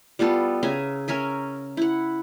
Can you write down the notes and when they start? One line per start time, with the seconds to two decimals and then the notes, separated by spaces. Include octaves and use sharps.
0.19 G3 B3 F4 A4
0.63 C#3 E5 G#5 A#5
1.08 C#4 A#4 E5 G#5
1.77 E4 F#5